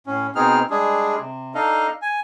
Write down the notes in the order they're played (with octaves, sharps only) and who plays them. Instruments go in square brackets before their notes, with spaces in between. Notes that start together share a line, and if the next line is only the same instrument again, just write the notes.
[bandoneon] A2 C#4
B2 B3 C4 D#4 G#4 F6
G3 G#3 D4 G#4
C3
D4 D#4 A4 D#5 F5
G#5